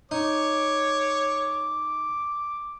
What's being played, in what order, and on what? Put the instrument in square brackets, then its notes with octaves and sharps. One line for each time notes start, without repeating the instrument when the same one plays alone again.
[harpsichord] D#4 [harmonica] C#5 [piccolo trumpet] D6